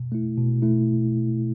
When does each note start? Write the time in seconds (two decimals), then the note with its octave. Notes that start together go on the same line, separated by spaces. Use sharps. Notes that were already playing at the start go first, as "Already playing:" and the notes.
Already playing: B2
0.12 A3 E4
0.37 B2
0.62 A3 E4